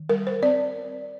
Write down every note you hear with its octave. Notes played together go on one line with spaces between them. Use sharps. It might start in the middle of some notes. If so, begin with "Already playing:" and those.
Already playing: D#3
G3 A#4
C5
C4 D5